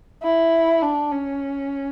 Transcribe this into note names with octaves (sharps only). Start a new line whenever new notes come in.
E4
D4
C#4